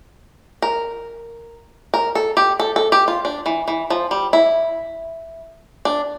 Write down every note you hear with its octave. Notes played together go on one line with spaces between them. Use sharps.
A#4
A#4
A4
G4
A4
A4
G4
F4
D4
E3
E3
F3
G3
E4
D4